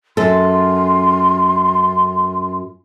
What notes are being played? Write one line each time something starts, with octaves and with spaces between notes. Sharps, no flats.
F#2 A4 C6